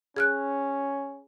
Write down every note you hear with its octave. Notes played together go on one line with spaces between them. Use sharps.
C#4 G#4 F6 F#6